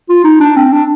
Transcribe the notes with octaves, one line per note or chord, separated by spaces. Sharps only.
F4
D#4
D4
C4
D4